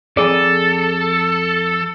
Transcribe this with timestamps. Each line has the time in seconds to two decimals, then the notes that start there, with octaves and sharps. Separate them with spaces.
0.17 F2 G#4 A4 D5